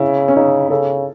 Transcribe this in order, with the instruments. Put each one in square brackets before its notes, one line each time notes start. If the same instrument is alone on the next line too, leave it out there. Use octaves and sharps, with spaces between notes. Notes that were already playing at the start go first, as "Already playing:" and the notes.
Already playing: [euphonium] C#3 [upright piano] E4
[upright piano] C#4
[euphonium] C#3 [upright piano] D#4
[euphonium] C#3 [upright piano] A4